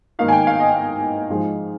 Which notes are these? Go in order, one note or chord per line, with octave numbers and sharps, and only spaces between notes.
G#2 D#3 A#3 D#4 F5
G#5
G5
F5
D#5
F5
G#2 F3 G#3 D#4